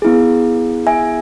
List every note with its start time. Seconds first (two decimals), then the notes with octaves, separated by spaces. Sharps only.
0.02 B3 E4 G#4
0.87 E5 G#5